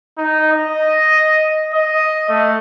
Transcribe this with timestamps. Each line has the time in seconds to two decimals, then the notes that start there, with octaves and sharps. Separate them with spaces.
0.18 D#4
0.53 D#5
1.74 D#5
2.29 A3